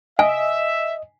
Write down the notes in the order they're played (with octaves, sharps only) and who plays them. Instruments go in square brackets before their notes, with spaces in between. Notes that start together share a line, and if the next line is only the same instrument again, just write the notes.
[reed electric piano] D#5 [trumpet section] E5 [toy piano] G#5